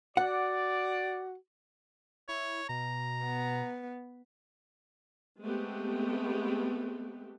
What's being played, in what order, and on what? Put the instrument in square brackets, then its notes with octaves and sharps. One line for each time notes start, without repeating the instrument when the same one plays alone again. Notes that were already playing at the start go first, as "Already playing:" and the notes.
[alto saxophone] F#4 [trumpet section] D5 [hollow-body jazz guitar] F#5
[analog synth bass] E4 [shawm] C#5
[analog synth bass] B2 [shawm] A#5
[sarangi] B3
[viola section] G#3 A3 B3 C4 G4